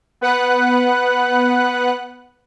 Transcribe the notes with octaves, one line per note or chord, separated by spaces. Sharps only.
B3 B4 F#5 F#6